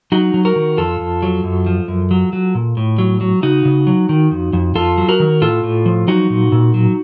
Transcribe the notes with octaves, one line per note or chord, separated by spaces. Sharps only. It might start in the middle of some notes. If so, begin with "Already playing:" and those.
F#3 D#4 F#4
F#3
F#4 A#4
D#3
F2 F4 A4
F2
F#3
F#2
F3
F#2
F#3
F#3
A#2
A2
F#3
F#3
C#3 D#4 F#4
C#3
F#3
D#3
F2
F2
F2 F4 A4
F#3
F#4 A#4
D#3
A2 F4 A4
A2
F3
F#3 D#4 F#4
A#2
A#2
F#3